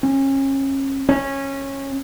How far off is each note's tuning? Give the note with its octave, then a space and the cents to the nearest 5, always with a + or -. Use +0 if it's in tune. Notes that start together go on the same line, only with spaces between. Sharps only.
C#4 -30
C#4 -15